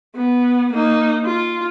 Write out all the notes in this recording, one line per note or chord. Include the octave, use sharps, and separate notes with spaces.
B3
A#3 D#4
F4